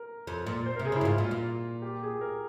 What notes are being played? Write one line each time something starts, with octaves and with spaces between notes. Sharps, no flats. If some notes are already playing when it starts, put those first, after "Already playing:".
Already playing: A#4
F2
A#2
C5
C3 A#4
G#4
C#3 E4
G2
G#2 F4
A#2
F4
A#2
G4
G#4
A#4